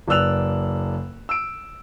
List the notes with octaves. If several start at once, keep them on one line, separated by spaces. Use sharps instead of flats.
F#1 B4 D5 E6 F#6 F7
E6 D7